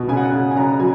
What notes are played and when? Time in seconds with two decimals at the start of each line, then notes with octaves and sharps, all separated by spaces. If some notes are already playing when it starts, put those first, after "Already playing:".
Already playing: B2
0.08 C#3 G#5
0.17 F#5
0.26 G#5
0.32 C#3
0.51 G#5
0.56 C#3 A#5
0.80 F#3 G#5